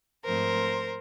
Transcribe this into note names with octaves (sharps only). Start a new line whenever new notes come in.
G#2 F3 A3 C4 A#4 C5